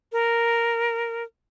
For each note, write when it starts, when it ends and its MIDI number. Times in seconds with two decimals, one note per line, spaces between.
0.12 1.23 70